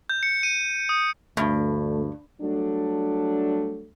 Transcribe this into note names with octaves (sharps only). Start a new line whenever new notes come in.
G6
C#7
D#7
D#6
D2 G2 A3
F#3 G3 A3 D4